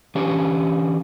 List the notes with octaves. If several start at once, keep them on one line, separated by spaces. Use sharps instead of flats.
E3 C#4 D4 G4 C#5